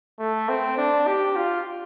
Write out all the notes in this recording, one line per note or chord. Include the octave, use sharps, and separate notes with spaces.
A3
C4
D4
G4
F4